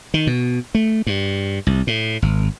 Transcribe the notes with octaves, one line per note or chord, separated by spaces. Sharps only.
D#3
B2
A3
G2
C2
A2
G#1